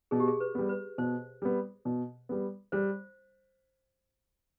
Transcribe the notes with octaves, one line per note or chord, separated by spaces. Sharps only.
B2 G#4
G4
G#4
B4
G3 B3
B4
B2 C5
G3 B3
B2
G3 B3
G3 C5